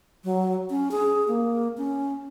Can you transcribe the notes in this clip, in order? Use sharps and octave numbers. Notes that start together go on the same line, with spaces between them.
F#3
C#4
G#4
A#3
C#4